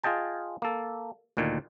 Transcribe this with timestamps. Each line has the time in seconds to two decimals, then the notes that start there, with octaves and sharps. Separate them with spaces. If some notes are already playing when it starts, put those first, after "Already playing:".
0.03 F4 G#4 D#5 G5 A5
0.62 A#3 A4
1.37 D2 A#2 D#3